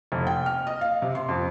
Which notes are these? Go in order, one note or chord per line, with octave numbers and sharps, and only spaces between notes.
F1
G5
F6
D#5
F5
C3
C6
F2